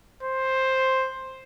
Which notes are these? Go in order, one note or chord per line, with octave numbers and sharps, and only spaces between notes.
C5